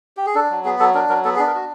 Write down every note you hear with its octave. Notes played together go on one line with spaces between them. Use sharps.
G4
G#4
D4 A4
F#3
B3 G#4
F#3 A4
D4 A#4
F#3 A#4
B3 A4
G#4
D4
A#4
F#4